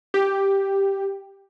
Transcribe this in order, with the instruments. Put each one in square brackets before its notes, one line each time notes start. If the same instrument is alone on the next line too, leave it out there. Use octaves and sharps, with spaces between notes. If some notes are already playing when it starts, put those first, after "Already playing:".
[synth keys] G4